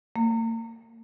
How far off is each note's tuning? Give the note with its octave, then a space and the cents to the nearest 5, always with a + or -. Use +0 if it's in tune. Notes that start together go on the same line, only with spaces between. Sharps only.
A#3 -40